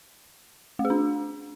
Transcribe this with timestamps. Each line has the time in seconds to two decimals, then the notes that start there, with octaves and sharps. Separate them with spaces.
0.79 A3
0.85 G#4
0.90 D4